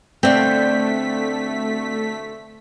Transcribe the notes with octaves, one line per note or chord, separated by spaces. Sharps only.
B2 D3 A3 C4 F5 B6